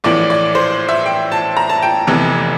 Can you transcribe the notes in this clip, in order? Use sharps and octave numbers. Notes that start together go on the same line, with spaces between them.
A#1 A2 E3 D5
D5
C5
E5
G5
A5
A#5
A5
G5
F1 E2 C3 E3